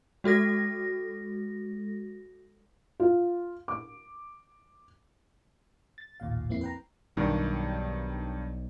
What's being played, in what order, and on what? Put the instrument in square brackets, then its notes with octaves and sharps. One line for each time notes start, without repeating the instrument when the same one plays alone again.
[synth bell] G#3 F#4 A4 A#6
[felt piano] F4
D6
[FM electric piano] A6
A1 D#2 A#2 F5
F2 A#3 C4 E4 C7
B4 G5 A#5
[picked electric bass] B1 [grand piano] G2 D#3